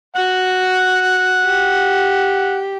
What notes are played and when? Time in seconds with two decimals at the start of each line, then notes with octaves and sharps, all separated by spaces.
0.16 F#4 F#5
1.44 G4